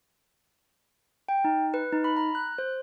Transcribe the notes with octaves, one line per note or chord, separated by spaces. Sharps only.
G5
D#4
B4
D#4
B5
A#5
F#6
C5